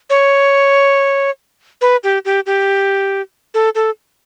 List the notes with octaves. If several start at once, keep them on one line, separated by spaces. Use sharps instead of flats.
C#5
B4
G4
G4
G4
A4
A4